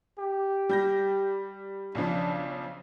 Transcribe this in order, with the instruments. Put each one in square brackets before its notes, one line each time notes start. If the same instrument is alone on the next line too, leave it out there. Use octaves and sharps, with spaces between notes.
[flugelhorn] G4
[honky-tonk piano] G3 G6 A#6
[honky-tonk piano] B1 C#3 F3 [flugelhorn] D4